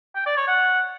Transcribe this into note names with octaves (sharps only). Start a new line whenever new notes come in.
G5
D5
C#5
F#5